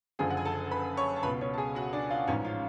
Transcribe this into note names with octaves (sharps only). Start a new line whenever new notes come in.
F#1 F#2 D3 F3 G#4 G#5
F#5
G#5
A4 A5
B4 B5
C#5 C#6
A5
C#2 B2 B4 B5
C#4 C#5
A5
G#4 G#5
F#4 F#5
D4 D5
F4 F5
A1 G#2 F3 C#4 C#5
F4 F5